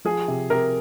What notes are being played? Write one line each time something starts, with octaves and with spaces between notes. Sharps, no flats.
F3 G#4
C3
C3 A#4